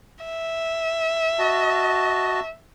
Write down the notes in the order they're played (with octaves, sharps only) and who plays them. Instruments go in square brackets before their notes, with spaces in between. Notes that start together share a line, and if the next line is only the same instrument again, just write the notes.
[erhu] E5
[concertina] F#4 D#5 A5